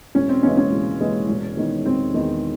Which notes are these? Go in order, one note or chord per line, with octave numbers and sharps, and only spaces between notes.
E1 C#4
C4
D#2 C#3 E3 G#3 C#4
C#4
E1
D#2 C#3 E3 G#3
E1
E2 D#3
E1 C4
E2 D#3